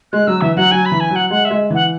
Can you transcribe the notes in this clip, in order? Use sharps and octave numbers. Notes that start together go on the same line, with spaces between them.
G#3 F#6
F#3 E6
E3 E5
F#3 F#5
F#3 G#5
B5
E3
G#5
F#3
F#5
G#3 F#5
E5
G#3
E3 F#5